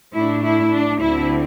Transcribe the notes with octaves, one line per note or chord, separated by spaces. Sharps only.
A2 A3 D4 E4
E4
D4
D2 D3 C4 E4